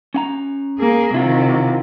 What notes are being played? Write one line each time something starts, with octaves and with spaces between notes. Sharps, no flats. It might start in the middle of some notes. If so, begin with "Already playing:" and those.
C#4 F#5 A#5
A#3 G#4
C3 D#3 E4 F4 F#5